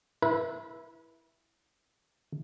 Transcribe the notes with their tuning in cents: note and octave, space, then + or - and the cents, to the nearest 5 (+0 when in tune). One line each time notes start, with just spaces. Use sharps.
E4 +0 B4 -35